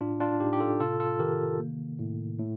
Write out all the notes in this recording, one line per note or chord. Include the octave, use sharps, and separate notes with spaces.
A2 D4 F4
D4 F4
A2 D#4 G4
G4
F4 A4
C3 F4 A4
F4 A4
D#3 G4 A#4
A#3
A2
A2